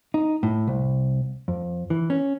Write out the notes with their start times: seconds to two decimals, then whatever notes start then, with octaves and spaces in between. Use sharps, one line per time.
0.14 D#4
0.43 A2
0.67 C2
1.48 F2
1.90 E3
2.10 C#4